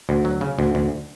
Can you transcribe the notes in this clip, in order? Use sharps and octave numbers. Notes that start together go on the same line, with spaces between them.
D2
F#3
C#3
D2
D2